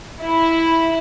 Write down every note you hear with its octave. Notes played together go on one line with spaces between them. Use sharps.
E4